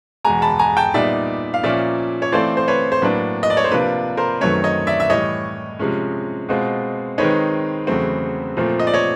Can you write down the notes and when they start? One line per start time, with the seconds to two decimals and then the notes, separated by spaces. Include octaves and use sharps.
0.25 E2 B2 G#3 G#5 A#5
0.42 A5 B5
0.59 G#5 A#5
0.77 G5 A5
0.94 A#2 G3 B3 D#4 D5 E5
1.54 F5
1.63 A#2 F3 A#3 C#4 D5 E5
2.22 C#5
2.32 E3 A3 C4 F4 C5 D5
2.57 C5
2.68 B4 C#5
2.92 C5
3.02 A2 F#3 A#3 D4 B4
3.43 D#5
3.50 D5
3.57 C#5
3.64 C5
3.72 C3 F3 A#3 D4 F4 B4
4.17 A#4 C5
4.41 F#2 D#3 F#3 A3 C4 B4 C#5
4.64 C#5 D#5
4.87 D5 E5
5.00 E5
5.10 A2 E3 G3 C#5 D#5
5.79 C3 F3 G#3 C#4
6.49 B2 G#3 C4 F4
7.18 D#3 G#3 C4 D#4 B4 C#5
7.87 E2 C#3 F#3 A3 C4
8.57 A#2 F3 A3 C4
8.79 D#5
8.87 D5
8.93 C#5 D#5